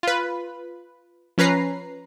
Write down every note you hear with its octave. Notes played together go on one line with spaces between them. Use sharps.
F4 B4
F3 C#4 B4 A#5 C7